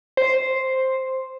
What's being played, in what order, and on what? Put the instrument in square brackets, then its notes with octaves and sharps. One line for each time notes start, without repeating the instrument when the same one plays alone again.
[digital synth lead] C5